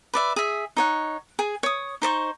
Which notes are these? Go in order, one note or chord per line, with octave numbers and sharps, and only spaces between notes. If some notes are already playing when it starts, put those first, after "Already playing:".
B4 D5 E5
G#4 E5
D#4 C#5 F#5
G#4 G#5
C#5 D#6
D#4 C5 D5 C#6